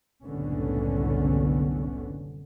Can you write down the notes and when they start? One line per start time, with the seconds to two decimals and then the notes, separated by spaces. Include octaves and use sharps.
0.25 F#1 C2 A2 D3 B3 C#4